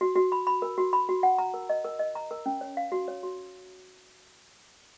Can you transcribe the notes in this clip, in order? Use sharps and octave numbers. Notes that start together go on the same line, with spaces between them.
F#4
F#4
B5
B5
A#4
F#4
B5
F#4
F#5
A#5
A#4
D#5
A#4
D#5
A#5
A#4
C#4
C#5
F5
F#4
C#5
F#4